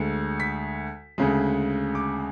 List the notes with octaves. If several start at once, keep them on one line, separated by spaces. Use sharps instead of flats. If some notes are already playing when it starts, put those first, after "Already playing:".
Already playing: D2 D3 G#3
B6
D2 C#3 G#3
D6